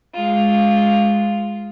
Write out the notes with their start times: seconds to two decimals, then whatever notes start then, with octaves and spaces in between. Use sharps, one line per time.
0.14 G#3 F4